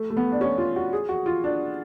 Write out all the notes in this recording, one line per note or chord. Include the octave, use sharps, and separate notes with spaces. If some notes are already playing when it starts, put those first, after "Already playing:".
Already playing: A3
A3
B3
D4
C#4
F4
F#4
G#4
F#4
F4
D4